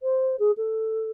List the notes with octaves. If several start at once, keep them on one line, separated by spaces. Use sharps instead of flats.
C5
G#4
A4